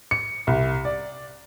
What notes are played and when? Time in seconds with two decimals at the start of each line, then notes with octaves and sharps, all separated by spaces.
0.11 C#7
0.47 C2
0.85 D5